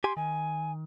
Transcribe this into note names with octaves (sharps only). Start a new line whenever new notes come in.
G4 G#5 C6
D#3 G#5